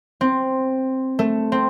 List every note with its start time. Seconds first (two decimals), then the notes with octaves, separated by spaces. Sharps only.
0.21 C4
1.19 A3
1.52 C4